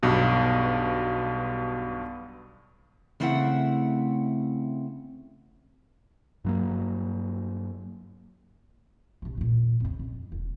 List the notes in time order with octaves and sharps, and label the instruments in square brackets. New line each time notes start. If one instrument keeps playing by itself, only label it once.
[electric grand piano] B1 G2 B2
[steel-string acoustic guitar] C#3 A3 C4 E4 E5 F#5
[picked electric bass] G2 F#3 A#3
[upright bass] C3 D4
E2 A#2
F2 C#3
F2
E1